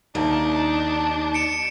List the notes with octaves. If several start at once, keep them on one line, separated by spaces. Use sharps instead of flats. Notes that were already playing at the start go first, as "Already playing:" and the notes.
D#2 D4 D#4 A5
C#7 D7 E7